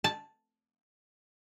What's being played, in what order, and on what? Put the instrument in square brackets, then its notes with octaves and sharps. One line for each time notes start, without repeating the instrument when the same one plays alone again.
[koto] A5